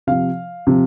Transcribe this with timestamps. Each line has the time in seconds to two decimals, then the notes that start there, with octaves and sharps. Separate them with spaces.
0.07 C3 F3 F5
0.67 C3 F3